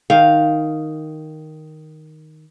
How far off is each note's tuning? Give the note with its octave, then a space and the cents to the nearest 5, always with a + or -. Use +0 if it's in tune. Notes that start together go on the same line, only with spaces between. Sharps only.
D#3 +0 F5 +0